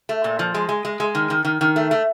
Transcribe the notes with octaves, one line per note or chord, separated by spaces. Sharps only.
A3
A#2
F3
G#3
G#3
G#3
G#3
D#3
D#3
D#3
D#3
A3
A3